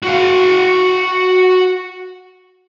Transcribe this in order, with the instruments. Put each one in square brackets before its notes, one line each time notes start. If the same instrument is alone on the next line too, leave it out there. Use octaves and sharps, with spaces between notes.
[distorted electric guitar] F#4 F5